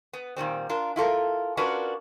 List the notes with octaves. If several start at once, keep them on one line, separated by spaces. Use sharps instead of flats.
B3
A#2 D#3 G3 C4
D4 F4 A#4
E4 F4 A4 A#4
C#4 D4 F4 F#4 A#4 B4